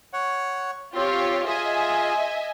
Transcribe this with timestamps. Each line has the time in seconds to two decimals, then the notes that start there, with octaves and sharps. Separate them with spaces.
0.13 C#5 F#5
0.95 C4 F4 G4 C#5 C6
1.47 F4 G#4 D#5 E5 G#5